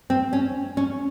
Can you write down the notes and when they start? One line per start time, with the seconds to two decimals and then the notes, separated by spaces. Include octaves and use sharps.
0.10 C4
0.33 C#4
0.77 C#4